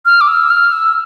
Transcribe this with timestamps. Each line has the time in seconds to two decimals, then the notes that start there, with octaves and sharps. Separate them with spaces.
0.06 F6
0.21 D6
0.28 E6
0.50 F6
0.73 E6